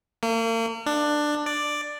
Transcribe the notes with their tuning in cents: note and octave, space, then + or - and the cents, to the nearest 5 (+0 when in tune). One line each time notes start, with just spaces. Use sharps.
A#3 -40
D4 +15
D5 +5